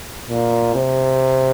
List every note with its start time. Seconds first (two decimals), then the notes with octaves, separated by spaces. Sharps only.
0.30 A#2
0.75 C3